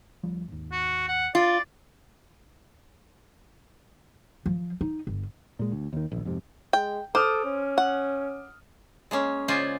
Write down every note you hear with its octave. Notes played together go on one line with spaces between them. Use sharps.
D2 F3 G3
G#1 D#2
F#4
F#5
F4 D5
F3
D#4
G1
A#2 G#3
D2
D#2 D#3
A#1 D#2
F2 G#2 C3
G#3 G5
A4 C5 D6 D#6 F6
C#4
F#5
G#3 A#3 C#4
C#3 F4 C5 D5 D#5 G#5